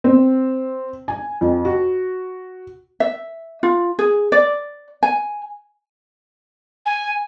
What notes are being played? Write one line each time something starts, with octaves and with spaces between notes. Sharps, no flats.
C4
G#5
F2
F#4
E5
F4
G#4
D5
G#5
G#5